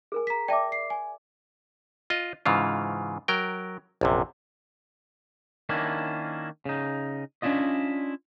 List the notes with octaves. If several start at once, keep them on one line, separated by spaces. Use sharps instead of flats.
G#4 A#4 G#5
A#5 B6
D5 E5 G5 A5 D6
C7
G#5
F4 D#5
G#2 C#3 E3 F4
F#3 A#4 G5
A#1 F#2 C3
D#3 A#3 C#4 D4 E4
C#3 D#4
C#4 D4 E4 F4 D#5